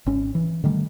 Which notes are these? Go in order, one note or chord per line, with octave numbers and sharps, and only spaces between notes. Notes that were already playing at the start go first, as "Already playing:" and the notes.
G#1 C#4
E3
D3 D#3 G3 A3